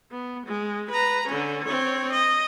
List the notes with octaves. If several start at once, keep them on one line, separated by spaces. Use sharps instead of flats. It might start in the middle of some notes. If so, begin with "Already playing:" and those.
B3
G#3
B4 A#5
D3 C#4
C4 C#5
D#5